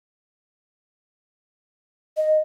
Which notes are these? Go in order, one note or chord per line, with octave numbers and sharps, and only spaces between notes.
D#5